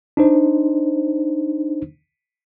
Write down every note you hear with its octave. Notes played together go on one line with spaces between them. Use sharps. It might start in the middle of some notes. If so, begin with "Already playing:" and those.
D4 D#4 C5